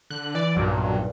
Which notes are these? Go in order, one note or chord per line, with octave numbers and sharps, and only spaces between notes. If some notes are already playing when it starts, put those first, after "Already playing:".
D3 F#6
E3 D5
B1 G2 A#2 F#3